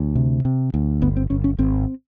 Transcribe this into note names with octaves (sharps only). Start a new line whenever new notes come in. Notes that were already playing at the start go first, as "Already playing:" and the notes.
Already playing: D2
C3
C3
D2
G1 B3
C4
G1 C#4
C#4
G#1 C4